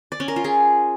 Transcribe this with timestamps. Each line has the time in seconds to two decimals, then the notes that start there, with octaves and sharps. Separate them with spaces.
0.12 D5
0.20 C#4
0.28 A#4
0.36 F4
0.44 G#4